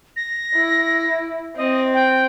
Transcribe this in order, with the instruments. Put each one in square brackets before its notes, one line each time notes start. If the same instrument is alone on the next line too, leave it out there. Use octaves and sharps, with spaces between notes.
[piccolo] A#6
[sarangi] E4
[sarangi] C4 [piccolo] D#5
[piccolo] G5